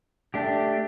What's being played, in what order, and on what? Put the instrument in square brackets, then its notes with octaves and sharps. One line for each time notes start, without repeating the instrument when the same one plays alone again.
[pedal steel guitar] A3 D4 G4